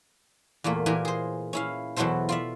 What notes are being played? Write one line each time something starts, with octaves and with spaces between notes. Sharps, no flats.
E2 A#2 A3 A#3
A#2 E3 G4 A#4 G#5
G#4 C5
C#4 E4 F5
E2 B2 F#3 E4 A4 C5
F4 D5 E5